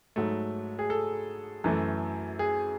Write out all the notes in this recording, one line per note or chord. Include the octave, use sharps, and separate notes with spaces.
G#2 F#3 A3
G#4
A4
F#2 E3 A3
G#4